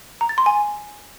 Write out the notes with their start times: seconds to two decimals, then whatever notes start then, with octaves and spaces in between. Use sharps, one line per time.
0.21 A#5
0.29 A6
0.38 C6
0.46 G#5